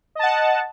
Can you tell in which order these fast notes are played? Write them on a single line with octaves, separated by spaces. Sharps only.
D#5 A5 F#5